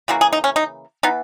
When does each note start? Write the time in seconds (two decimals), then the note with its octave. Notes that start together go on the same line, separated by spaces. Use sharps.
0.08 C#3 E3 A#3 F#4
0.21 G#4
0.33 D#4
0.44 C#4
0.56 D#4
1.03 E3 B3 D#4